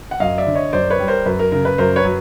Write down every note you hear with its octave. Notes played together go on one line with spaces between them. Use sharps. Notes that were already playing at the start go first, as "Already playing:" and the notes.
F#5
F#2 D#5 F5
D5 E5
D3
C#5 D#5
F#2 C5 D5
B4 C#5
G3
A#4 C5
F#2 B4
A#4
C#3 A#4
B4
F#2 A#4 C5
B4 C#5
F#3